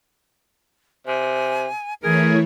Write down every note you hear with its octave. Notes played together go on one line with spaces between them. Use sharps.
C3 G#5
E3 A3 E4 G#4 A#4 C#5